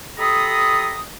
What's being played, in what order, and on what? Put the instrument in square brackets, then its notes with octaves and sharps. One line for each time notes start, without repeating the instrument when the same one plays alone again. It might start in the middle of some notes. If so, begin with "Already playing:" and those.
[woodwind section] G4 A4 D#5 A#5 B5 D#6